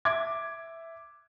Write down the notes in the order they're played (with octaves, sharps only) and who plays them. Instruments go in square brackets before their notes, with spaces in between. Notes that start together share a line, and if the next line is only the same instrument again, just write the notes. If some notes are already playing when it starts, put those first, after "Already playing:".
[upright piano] E5 D6 G#6